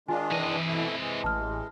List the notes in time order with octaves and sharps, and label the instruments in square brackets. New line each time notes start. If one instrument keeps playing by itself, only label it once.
[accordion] D#3 G#3 D4 [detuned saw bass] F4 [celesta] G#5
[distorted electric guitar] C3 D#5 [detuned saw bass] E3
[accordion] B2 A3 E4
E3 G#3
[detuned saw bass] A1 [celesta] A5 F6